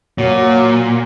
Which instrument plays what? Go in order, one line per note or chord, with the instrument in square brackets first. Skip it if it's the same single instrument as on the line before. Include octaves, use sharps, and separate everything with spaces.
[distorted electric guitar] A#2 [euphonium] F#3